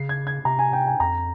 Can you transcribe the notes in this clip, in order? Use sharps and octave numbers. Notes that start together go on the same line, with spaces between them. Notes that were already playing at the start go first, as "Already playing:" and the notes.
Already playing: C#3 C7
G#6
G#6
C3 A#5
G#5
G5
G#5
F2 A#5